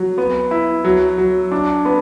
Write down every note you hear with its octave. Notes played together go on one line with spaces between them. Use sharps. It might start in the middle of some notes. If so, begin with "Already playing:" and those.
Already playing: F#3
B3
E4
F#3
F#3
D4
B3